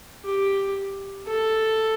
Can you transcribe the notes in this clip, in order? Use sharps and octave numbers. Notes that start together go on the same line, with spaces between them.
G4
A4